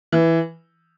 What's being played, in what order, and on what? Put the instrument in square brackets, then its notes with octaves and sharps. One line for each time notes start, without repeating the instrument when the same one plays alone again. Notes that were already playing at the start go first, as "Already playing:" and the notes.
[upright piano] E3